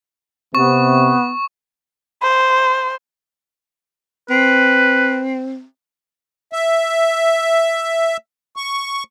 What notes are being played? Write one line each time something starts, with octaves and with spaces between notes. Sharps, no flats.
C3 B3 C#6
C5
C4 B4
E5
C#6